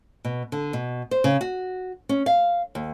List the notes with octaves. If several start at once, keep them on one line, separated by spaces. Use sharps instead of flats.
B2
D3
B2
C5
C#3
F#4
C#4
F5
D#2